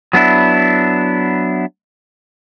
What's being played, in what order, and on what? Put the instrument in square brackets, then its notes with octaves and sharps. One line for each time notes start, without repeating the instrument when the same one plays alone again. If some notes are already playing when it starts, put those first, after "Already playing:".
[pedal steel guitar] F#3 B3 D4 E4